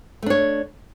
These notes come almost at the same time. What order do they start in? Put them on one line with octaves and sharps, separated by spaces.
A3 D4 C#5